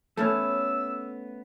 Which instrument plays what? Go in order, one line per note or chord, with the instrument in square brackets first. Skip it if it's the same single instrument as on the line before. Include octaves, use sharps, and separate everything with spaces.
[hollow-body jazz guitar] A3 B3 [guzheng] C#4 E4 A4 [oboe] E6